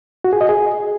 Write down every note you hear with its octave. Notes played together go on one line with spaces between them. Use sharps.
F#4
G#4
D#5
G#4